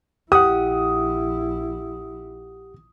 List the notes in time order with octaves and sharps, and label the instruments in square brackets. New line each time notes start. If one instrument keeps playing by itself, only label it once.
[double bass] A#1 E4 [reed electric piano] G4 F#5 [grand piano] D#6